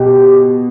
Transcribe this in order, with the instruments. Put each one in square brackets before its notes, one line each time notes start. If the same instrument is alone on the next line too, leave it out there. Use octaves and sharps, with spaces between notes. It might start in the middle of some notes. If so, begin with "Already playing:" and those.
Already playing: [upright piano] B2 [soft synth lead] G4